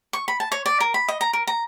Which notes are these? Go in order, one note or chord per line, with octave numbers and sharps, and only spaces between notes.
C#6
B5
A5
C#5
D5
A#4
B5
D#5
A#5
A#4
A#5